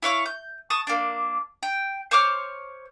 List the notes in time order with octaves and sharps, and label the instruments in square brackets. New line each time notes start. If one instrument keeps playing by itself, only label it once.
[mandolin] E4 C#5 F5 C#6
G6
A5 C#6 D#6
A#3 D4
G5
C5 C#5 D6 F6